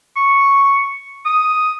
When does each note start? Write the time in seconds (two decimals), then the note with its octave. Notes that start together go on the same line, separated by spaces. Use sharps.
0.16 C#6
1.25 D#6